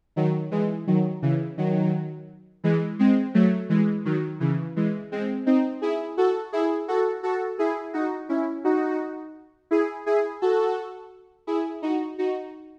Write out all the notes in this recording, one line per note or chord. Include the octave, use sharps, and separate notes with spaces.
D#3 F#3
E3 G#3
D#3 F#3
C#3 E3
D#3 F#3
E3 G#3
G#3 C4
F#3 A3
E3 G#3
D#3 F#3
C#3 E3
E3 G#3
G#3 C4
C4 D#4
E4 G#4
F#4 A4
E4 G#4
F#4 A4
F#4 A4
E4 G#4
D#4 F#4
C#4 E4
D#4 F#4
E4 G#4
E4 G#4
F#4 A4
E4 G#4
D#4 F#4
D#4 F#4